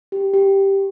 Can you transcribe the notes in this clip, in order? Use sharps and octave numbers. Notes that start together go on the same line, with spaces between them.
G4
G4